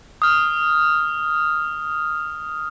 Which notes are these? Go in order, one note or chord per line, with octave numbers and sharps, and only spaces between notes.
D#6 F6